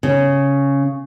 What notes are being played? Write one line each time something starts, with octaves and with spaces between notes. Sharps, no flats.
C#3